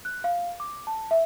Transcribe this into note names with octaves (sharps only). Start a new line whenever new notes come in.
F#6
F5
D6
A5
E5